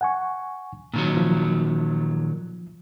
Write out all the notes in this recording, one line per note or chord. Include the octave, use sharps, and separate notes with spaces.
F#5 G#5 C#6
A#2 D#3 F#3
F3